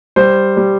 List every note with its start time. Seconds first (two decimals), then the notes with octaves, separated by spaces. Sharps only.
0.16 G3 C5
0.57 G3